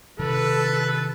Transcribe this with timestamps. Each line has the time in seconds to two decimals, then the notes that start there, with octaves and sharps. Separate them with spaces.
0.19 C3 D#3 A4 B4